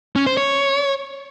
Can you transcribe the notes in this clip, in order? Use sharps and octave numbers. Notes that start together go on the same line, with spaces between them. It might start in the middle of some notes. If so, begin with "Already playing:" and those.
C#4
C5
C#5